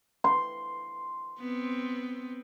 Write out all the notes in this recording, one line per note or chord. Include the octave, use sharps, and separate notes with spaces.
C6
B3 C4